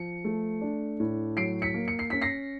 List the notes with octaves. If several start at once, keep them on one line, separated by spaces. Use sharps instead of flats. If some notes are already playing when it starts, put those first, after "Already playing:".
Already playing: F3 C#7
A3
D4
A2
F#3 C7 D7
B6 C#7
A#3
C#7
C7
C#4 B6
A#6 C7